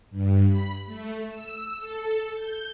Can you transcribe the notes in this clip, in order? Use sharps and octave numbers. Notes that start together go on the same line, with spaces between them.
G2
B5
A3
E6
A4
G6